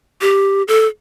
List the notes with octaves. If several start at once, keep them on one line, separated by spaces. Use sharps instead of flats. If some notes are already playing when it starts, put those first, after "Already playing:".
G4
A4